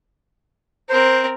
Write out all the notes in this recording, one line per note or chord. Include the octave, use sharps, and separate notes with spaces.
C4 A#4 C5